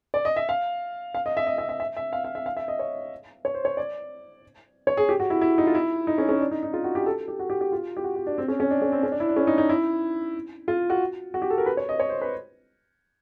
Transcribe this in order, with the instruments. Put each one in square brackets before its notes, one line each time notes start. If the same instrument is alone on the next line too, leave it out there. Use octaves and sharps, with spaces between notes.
[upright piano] D5
D#5
E5
F5
F5
D#5
E5
D#5
E5
E5
E5
E5
F5
F5
E5
F5
E5
D#5
C#5
C#5
C5
C#5
D5
C#5
G#4
G4
F#4
E4
E4
D#4
F4
E4
D#4
C#4
C#4
D4
D#4
D#4
F4
F#4
G4
A4
G4
F#4
G4
G4
F4
G4
F#4
F#4
D4
C4
C#4
C#4
D4
C#4
C4
C#4
D4
E4
D4
C#4
D#4
D#4
E4
F4
F#4
F#4
G4
A4
A#4
B4
C#5
D#5
C#5
C5
B4